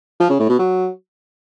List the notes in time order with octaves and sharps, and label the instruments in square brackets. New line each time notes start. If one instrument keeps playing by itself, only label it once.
[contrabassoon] F3
C#3
A2
B2
F#3